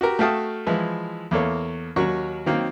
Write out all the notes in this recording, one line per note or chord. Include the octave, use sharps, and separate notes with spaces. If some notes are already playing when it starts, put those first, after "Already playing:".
F#4 G4 A#4
A3 F#4 F5 G5 A5 D#6
E3 F3 G#3 E4
E2 A#3 A4 C#5
D#2 F#3 F#4 A#4 C#6
D#3 F#3 A#3 C4